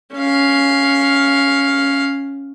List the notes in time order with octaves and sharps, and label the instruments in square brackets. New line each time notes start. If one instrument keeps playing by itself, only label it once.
[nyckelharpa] C#4 F5